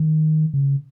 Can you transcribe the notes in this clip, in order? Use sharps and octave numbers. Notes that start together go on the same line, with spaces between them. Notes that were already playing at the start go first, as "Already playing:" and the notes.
Already playing: D#3
C#3